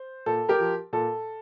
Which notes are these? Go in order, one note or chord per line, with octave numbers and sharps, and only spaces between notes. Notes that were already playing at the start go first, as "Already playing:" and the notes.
Already playing: C5
A#2 A4
G4 A#4
F3
A#2 A4